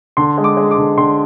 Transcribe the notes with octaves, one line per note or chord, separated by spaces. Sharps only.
D3 C6
G#3
D6
G#3
D6
D3
D3 C6